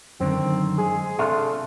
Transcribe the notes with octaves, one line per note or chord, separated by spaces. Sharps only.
F#2 D3 D#3 C4
G#3 G#4
C3 A3 D4 F4